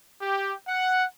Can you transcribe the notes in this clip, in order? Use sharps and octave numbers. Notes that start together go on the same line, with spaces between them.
G4
F#5